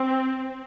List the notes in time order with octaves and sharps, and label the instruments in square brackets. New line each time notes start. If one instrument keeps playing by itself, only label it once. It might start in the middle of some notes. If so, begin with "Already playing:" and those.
Already playing: [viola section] C4